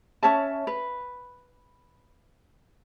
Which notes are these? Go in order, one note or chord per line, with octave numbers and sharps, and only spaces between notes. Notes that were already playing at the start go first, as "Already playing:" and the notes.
C#4 C#5 E5 A5
B4